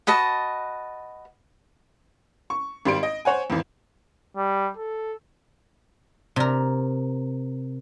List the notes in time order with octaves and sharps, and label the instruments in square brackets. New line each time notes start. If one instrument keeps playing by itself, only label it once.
[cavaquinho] F#4 B4 D#5 A5
[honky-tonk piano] C#6
G#1 G3 C6 D7
D#5
C5 C#5 F#5 G#5
G#1 E2
[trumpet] G3
A4
[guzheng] C3 A#4